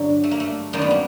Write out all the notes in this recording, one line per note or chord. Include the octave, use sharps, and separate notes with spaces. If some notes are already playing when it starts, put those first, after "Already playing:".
Already playing: G2 D3 F#3
A3
A#3
A3
F#2 D#3 G3 A#3
B3
A#3